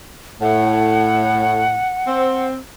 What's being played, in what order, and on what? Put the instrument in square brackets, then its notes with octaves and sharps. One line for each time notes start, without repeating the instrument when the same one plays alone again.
[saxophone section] A2 [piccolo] F#5
[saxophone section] C4